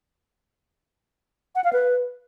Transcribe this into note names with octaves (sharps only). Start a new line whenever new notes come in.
F#5
F5
B4